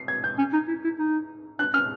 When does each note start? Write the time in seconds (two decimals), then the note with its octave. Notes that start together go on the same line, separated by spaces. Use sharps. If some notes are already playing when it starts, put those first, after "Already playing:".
Already playing: C7
0.08 G#6
0.24 G6
0.38 C#4
0.53 D#4
0.68 E4
0.84 E4
0.99 D#4
1.59 D4 F#6
1.74 C#4 F6